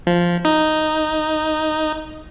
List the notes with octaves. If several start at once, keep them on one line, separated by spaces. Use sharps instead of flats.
F3
D#4